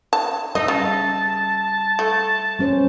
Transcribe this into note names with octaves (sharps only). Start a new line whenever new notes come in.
A5
G3 D#4 D#5 E5
C#3 A5
A3
G3 C#4 C5